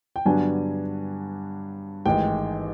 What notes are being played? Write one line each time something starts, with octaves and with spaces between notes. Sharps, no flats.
G5
G2 D3 F#3 B3 D4 G#5
A1 G#2 D#3 G#3 G5